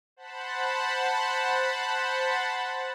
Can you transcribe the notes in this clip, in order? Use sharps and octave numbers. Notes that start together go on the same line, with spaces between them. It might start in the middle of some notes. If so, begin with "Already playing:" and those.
C5 F#5 A5 B5